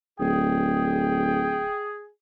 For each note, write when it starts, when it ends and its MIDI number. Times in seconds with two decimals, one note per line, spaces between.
0.19 1.72 26
0.19 2.08 68
0.19 1.88 79